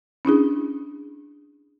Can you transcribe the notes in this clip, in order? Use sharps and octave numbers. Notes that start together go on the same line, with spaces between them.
C#4 D4 E4 G#4